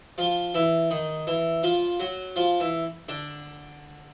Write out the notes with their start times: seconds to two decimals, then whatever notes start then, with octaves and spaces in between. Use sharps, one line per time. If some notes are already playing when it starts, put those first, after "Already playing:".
0.18 F3 F4
0.54 E3 E4
0.91 D#3 D#4
1.27 E3 E4
1.63 F3 F4
2.00 F#3 F#4
2.36 F3 F4
2.60 E3 E4
3.08 D3 D4